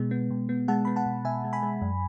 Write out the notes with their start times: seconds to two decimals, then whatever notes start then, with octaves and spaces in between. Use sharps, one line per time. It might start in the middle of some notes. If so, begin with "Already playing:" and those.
Already playing: B2 G#3 B3
0.11 B3
0.31 B2
0.49 B3
0.68 G#3 F#5 A5
0.85 B3 B5
0.96 F#5 A5
1.06 B2
1.25 B2 E5 G#5
1.44 G#3
1.53 G#5 B5
1.63 G#3
1.82 F#2